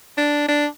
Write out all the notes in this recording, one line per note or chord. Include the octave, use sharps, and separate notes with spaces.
D4
D4